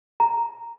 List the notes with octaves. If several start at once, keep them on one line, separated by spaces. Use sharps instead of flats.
A#5